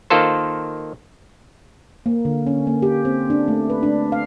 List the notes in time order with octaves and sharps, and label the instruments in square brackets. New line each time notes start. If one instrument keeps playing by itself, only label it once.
[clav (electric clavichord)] D#3 A#3 F4 A4 C5
[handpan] A#3
D3
C#4
A#3
G4
C4
D4
A3
B4
D4
F5